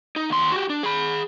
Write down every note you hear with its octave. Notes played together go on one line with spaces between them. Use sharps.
D#4
D#2 C6
F#4 G4
D4
G#4 B5